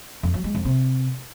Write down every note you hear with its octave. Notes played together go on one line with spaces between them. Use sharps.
F2
F#3
G#3
F2
C3